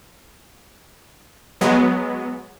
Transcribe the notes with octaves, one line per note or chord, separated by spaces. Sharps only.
F#3 G#3 B3